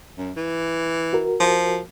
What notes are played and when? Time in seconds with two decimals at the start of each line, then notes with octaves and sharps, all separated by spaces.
0.18 F#2
0.37 E3
1.13 F#4 A#4
1.40 F3